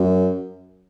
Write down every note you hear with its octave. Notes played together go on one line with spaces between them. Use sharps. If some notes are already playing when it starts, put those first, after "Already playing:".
Already playing: F#2